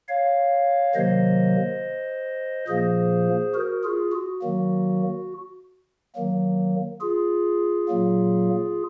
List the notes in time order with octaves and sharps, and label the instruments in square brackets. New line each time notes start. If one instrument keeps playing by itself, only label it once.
[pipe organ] C#5 F5
C3 D#3 F#3 A#3 C5 D#5
A#2 F3 A#3 G#4 C5
F#4 A#4
F4 G#4
F#4
D#3 F#3 A#3
D#3 F#3 A#3
F4 G#4
A#2 F#3 A#3